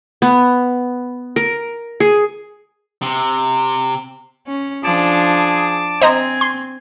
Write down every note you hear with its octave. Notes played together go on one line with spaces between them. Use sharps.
B3
A#4
G#4
C3
C#4
F3 D4 G#4 A5 D6
C4 C5 D#5 G#5 A#5
C6